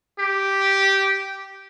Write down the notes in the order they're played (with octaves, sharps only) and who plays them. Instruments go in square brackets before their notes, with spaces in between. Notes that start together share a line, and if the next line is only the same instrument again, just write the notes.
[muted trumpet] G4